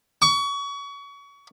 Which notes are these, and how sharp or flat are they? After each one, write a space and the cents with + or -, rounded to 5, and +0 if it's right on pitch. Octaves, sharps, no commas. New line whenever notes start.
C#6 +30